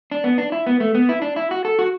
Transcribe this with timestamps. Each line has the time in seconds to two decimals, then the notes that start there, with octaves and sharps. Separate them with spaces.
0.12 D4
0.24 B3
0.38 D4
0.52 E4
0.67 B3
0.80 A3
0.95 B3
1.09 E4
1.22 D4
1.36 E4
1.51 F#4
1.65 A4
1.79 F#4